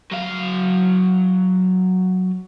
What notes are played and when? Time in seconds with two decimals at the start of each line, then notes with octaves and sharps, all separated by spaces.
0.11 F#3 F5